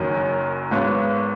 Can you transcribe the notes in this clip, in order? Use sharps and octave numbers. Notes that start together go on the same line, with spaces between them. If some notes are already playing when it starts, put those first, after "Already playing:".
Already playing: F#1 F#2 D#3 F#3
G#1 G#2 F#3 B3